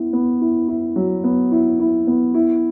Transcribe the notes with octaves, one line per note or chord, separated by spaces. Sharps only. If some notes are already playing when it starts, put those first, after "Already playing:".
Already playing: B3 E4
B3
E4
E4
F#3
B3
E4
E4
B3
E4